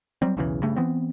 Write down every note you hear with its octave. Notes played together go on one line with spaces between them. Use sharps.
F#3 G3 C4
B1 E2 C#3 E3
G2 C#3 A3
E3 B3 C4